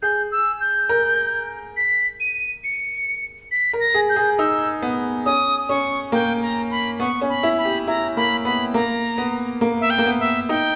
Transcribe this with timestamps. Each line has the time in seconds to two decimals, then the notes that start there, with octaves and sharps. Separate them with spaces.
0.02 G#4 G6
0.32 E6
0.60 G6
0.89 A#4
1.77 B6
2.20 D#7
2.64 C#7
3.51 B6
3.73 A#4
3.80 A#6
3.94 G#4
4.10 G6
4.16 G#4
4.38 D#4 E6
4.82 B3
5.26 C#4 D#6
5.69 C#4 C#6
6.12 A#3 G5
6.42 A#5
6.71 B5
7.00 B3 C#6
7.21 C#4
7.29 B5
7.43 E4
7.58 B5
7.65 G4
7.87 E4 A#5
8.16 A#3 B5
8.45 B3 B5
8.74 A#3 A#5
9.18 B3
9.61 A#3
9.81 E5
9.90 G5
9.98 A#3
10.06 B3
10.20 E5
10.49 D#4 G5